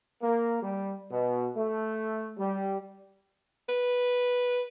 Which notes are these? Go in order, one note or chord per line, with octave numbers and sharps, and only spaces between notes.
A#3
G3
B2
A3
G3
B4